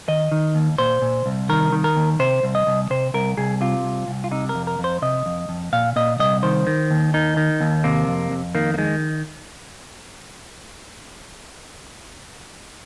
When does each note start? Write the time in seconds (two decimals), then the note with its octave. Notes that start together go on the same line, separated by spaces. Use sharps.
0.08 D#3 D#5
0.32 D#3
0.55 D#2
0.78 A#2 C5
1.02 A#2
1.26 C2
1.49 D#3 A#4
1.72 D#3
1.84 A#4
1.96 D#2
2.19 C3 C5
2.43 C2
2.55 D#5
2.67 C2
2.90 C3 C5
3.14 C2 A#4
3.37 C2 G#4
3.61 C3 F4
3.84 C2
4.08 C2
4.24 F4
4.31 C3 D#4
4.49 A#4
4.55 F2
4.67 A#4
4.79 F2
4.84 C5
5.02 C3 D#5
5.26 F2
5.49 F2
5.73 A#2 F5
5.96 A#2 D#5
6.20 C2 D#5
6.43 D#3 C5
6.67 D#3
6.91 D#2
7.14 D#3 D#4
7.37 D#3
7.61 D#2
7.84 C3 A#3
8.08 F2
8.31 F2
8.55 D#3 A#3
8.74 A#3
8.78 D#3 G#3